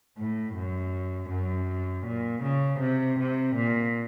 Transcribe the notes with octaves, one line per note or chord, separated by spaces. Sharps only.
A2
F#2
F#2
A#2
C#3
C3
C3
A#2